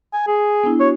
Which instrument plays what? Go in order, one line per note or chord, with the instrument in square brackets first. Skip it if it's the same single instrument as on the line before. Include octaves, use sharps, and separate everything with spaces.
[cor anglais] G#5
G#4
[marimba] B3 D4 E4
[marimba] F#4 [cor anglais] C#5